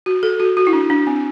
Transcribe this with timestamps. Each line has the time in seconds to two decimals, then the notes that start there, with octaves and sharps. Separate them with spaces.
0.06 F#4
0.23 A4
0.40 F#4
0.57 F#4
0.67 E4
0.73 D4
0.90 D4
1.07 C4